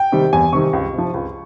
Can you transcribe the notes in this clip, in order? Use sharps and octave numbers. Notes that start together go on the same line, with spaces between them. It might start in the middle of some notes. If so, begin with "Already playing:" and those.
Already playing: G5
C3 D#3 G3
E2 G#5
C3 D#3 G3 C#6
C#2
C3 F3
C#2